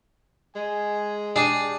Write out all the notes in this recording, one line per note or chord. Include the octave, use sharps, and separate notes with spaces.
G#3 G#5
D4 G4 G#4